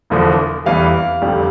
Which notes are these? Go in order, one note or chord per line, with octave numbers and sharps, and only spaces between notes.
E1 E2 D3 F3
F1 E2 E3 G3 F5
F1 F2 D3 G3